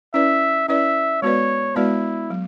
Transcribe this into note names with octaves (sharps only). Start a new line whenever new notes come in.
C#4 E4 B4 D5 E5
C#4 E4 B4 D5 E5
G#3 B3 F#4 B4 C#5 D5
G#3 B3 E4 F#4 B4 D5
F#3